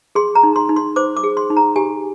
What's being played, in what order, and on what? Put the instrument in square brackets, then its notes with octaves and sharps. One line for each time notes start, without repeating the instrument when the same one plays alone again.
[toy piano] G#4 C6
A#5
D#4
C6
D#4
C6
C5 D6
D6
G#4
C6
D#4
A#5
G4 G#5